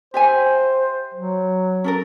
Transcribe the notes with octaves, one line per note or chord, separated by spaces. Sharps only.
G4 C5 E5 G#5
F#3
C#4 A4 A#4